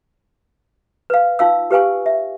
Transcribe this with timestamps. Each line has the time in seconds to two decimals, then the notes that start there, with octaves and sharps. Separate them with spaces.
1.10 B4 F5
1.39 D#4 F4 F5 E6
1.71 G4 B4 F5 G#5 C#6
2.06 E5